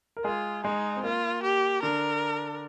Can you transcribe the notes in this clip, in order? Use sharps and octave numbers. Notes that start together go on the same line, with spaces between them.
A#4
G#3 F4 G#4
G#3 D#4 G#4
C4
A#3 F4
G4
D3 D4 A#4